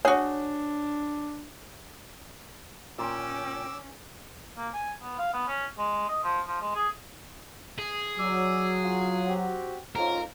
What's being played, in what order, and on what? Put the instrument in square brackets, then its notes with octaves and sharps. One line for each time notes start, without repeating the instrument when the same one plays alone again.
[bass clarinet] D4 [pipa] F#4 G#4 [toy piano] C#5
[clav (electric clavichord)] A#2 [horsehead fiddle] C#4 [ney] G5 [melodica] D6 E6
[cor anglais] A#3
G#5
B3
F5
B3
C#4
G#3
D#5
F3
F3
G#3
G#4
[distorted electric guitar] G#4
[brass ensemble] F#3 [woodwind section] D5 D6 E6
[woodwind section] F4
C4 F#4 G4
[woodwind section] F2 G#2 [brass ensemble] C#4 F4 [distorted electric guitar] A#4